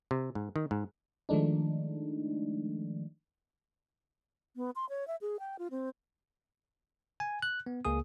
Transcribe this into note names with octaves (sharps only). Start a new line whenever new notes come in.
C3
G#2
D#3
G#2
D#3 F3 G#3 A3 D4 D#4
B3
C6
C#5
E5
G#4
G5
F4
C4
G#5
F#6
B3
C#2 A#3 G#4 D#6